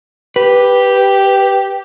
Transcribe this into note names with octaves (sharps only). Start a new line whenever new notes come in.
G4 B4